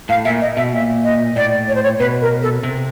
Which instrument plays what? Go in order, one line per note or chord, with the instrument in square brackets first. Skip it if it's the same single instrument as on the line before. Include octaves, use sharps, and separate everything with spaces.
[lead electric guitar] A2 [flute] F5
[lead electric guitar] A#2 [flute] E5
[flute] D#5
[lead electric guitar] B2 [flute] E5
[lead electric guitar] A#2 [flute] E5
[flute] D#5
[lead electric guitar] A2 [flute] D5
[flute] C#5
C5
C#5
[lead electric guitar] B2 [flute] B4
[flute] A#4
A4
[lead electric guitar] C3